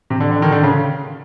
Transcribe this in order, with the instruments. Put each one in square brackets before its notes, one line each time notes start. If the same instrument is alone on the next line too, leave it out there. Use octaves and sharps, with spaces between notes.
[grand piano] C3
D3
D3
D#3
D3
C#3